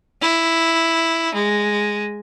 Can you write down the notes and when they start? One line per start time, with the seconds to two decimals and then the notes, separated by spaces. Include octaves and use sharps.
0.22 E4
1.34 G#3